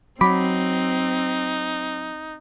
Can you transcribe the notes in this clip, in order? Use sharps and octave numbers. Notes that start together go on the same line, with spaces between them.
F#3 C4 D#4 B5 D6 B6